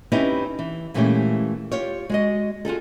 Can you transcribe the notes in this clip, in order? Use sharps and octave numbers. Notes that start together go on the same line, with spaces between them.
C4 C#4 D#4 E4 G4 B4
E3
A#2 E3 G#3 A3 C#4 G4
F4 G4 C#5
G#3 F#4 D#5
F4 F#4 G#4 A4